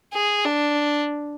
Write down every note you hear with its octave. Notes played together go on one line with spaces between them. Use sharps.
G#4
D4